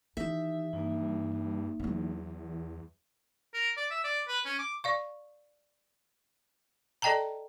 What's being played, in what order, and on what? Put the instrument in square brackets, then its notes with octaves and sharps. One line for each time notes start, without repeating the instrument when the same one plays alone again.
[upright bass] D#3 E3 [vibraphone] D#4 G4 [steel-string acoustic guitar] E5
[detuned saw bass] G2 [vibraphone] A#3 D#4
[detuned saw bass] E2 [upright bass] F#3 B3
[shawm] A#4
D5
E5
D5
B4
C#4
D6
[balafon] D5 F5 C#6
A4 D5 D#5 G5 A5 A#5